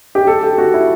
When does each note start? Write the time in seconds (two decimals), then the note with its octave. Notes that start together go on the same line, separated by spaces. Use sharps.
0.15 G4
0.27 A4
0.43 G4
0.58 F#4
0.74 E4